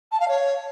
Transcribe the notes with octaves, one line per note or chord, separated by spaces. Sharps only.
A5
F5
C#5